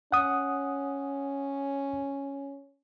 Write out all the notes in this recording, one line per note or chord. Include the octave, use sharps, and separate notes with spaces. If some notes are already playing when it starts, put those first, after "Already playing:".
C#4 F#5 D#6